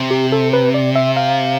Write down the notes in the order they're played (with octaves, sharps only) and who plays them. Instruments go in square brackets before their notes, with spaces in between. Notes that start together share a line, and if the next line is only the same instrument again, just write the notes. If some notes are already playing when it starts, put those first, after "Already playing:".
Already playing: [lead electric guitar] C3
[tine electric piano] G4
A4
B4
D5
E5
F5